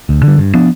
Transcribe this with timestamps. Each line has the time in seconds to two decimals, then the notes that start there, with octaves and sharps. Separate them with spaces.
0.09 D2
0.23 D3 G3
0.38 G2
0.54 F3 B3 D4